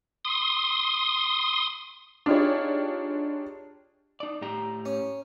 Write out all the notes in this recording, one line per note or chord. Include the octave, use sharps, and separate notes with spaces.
C6 D#6
D4 D#4 F4 G4 G#4 C#5
D#4 D5
A2 G4 A#5
C#4